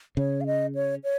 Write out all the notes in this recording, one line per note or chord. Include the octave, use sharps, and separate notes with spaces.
C#3 C#5
F5
D#5
C#5
C#5